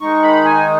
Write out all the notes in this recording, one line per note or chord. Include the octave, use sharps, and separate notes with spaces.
D#3 G#3 D#4 C#6
B5
G#5